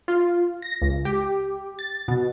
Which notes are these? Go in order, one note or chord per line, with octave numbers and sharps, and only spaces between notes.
F4
A#6
C#2
G4
A6
B2